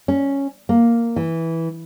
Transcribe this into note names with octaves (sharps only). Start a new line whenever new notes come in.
C#4
A#3
E3